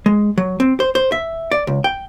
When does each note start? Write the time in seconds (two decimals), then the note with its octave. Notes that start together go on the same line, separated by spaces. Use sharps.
0.06 G#3
0.38 F#3
0.60 C4
0.80 C5
0.95 C5
1.12 E5
1.52 D5
1.67 C#2
1.84 G5